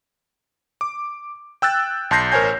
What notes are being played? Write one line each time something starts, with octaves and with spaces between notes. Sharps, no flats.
D6
G5 E6 F#6 A6
B1 A5 C6 G6 A#6 C7
A1 A#4 C5 C#5 G#5 G6